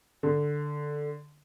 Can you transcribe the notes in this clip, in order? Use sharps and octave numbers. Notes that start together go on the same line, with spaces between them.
D3